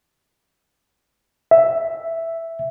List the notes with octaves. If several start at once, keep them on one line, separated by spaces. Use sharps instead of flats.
E5